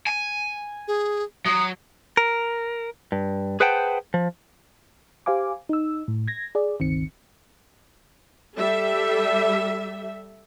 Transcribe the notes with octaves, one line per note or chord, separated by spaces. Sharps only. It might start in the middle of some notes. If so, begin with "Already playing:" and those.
G#5
G#4
F#3 D#6
A#4
G2
G#4 B4 C5 F#5 G5 A5
F3
G4 C5 F5 G#5 D6
D#4 E6
A2
G#6 A#6
G#4 D5
G1 C#2 D#3 C4 C#7
G3 A4 E5